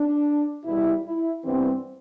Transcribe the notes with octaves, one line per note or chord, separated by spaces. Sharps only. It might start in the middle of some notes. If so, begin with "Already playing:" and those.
Already playing: D4
E2 B2 G3 E4
E4
G2 E3 G3 B3 C4